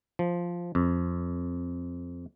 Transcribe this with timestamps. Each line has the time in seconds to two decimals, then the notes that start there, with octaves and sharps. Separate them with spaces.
0.19 F3
0.75 F2